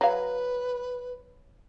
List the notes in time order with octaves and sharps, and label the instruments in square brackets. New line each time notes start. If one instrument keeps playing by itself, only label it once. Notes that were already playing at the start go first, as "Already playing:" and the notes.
[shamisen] F#3 G#4 F5 [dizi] B4